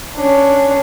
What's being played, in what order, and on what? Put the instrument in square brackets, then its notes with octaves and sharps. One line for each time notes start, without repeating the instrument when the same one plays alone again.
[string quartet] C#4 D4